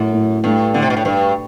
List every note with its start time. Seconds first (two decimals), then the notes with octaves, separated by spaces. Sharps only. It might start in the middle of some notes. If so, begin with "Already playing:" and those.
Already playing: F#2 A2
0.13 A2
0.44 G2 A3
0.74 D3 A3
0.82 C3
0.90 B2
0.97 A2
1.05 G2 B4